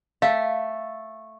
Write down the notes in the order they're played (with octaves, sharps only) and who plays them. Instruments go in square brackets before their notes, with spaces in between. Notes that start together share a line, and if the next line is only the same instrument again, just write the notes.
[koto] A3 [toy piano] F5